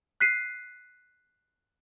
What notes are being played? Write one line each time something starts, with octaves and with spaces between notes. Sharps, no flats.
F#6 B6 C7 D#7